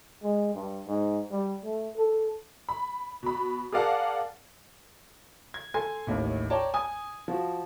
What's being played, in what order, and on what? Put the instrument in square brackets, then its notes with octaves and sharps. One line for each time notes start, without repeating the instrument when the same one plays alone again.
[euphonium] G#3
G2
G#2
G3
A3
A4
[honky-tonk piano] B5
B2 B5
G#4 A#4 D5 F5 F#5 A5
[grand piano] G#6
A4 G#5 C6 G#6
A1 D#2 A2
C#5 D5 G5 A5 A#5
G#5 D#6 G#6
F3 F#4